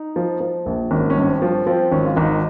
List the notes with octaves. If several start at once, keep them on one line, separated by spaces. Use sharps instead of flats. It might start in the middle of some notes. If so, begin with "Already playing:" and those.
Already playing: D#4
F3
F3
A#1
G#1 C#4
C#4
G2
C#4
C4
F3
F3 C4
G#1 C#4
F4
G#1 D#4